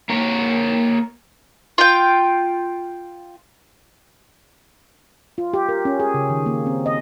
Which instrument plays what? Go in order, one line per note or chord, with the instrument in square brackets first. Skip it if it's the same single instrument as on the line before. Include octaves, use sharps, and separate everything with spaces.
[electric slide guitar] A#3 A#4 C#5
[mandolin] F4 G5
[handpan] F4
G4
A#4
C#4
G#4
C#3
D#3
A#3
C4
D#5